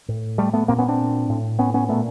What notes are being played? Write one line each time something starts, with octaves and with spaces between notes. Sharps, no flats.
A2
G3 A3
A3 B3
A#2 A#3 C4
B3 C#4
C4 D4
A2
B3 C#4
B3 C#4
A#2 A3 B3